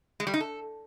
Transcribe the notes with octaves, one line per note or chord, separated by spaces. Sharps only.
G#3
G3
D#4
A4